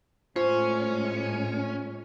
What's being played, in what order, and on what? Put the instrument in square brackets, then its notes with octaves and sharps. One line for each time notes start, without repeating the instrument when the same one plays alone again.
[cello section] A2 G#3 [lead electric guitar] C#4 [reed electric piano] F4 [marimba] C5